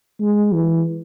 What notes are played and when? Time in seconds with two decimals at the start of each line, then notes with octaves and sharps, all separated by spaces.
0.20 G#3
0.54 E3